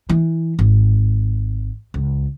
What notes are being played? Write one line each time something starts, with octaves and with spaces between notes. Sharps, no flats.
E3
G#1
C#2